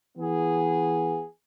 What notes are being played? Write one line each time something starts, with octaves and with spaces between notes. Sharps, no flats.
E3 B3 G#4